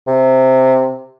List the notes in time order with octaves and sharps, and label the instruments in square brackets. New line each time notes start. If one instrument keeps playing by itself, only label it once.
[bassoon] C3